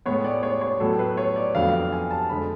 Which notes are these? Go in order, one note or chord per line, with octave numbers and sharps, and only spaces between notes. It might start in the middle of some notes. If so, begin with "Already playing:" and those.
A2 G#3 B3 C#5
D5
C#5
C#5
A2 F#3 B3 A4
B4
C#5
D5
F2 D3 F#3 B3 F5
F5
G#5
A5
F2 D3 G#3 B5